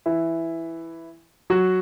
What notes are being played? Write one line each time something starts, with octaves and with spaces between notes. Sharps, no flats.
E3 E4
F#3 F#4